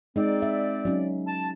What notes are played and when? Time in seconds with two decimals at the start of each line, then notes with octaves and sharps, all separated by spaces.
0.16 G#3 C4 D#4 D5
0.42 E5
0.85 F#3 C#4 D#4
1.26 A5